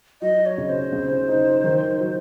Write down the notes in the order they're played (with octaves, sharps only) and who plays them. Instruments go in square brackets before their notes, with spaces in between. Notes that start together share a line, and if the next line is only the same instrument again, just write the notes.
[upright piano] F#3 [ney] D#5
[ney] C#5
[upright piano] C#3
[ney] C5
[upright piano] C#3
D#4
D#3
F#3